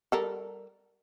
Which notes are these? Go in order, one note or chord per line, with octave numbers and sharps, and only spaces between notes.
G3 A4 A#4